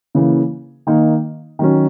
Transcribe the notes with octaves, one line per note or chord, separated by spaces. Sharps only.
C#3 E3 A#3
D#3 A#3 D#4
D#3 F#3 C#4